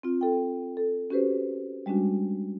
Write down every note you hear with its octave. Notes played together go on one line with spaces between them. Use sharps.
C4 F4
A4 G5
A4
C#4 F#4 G4 B4 C5
G3 G#3 C#4 D4 F#4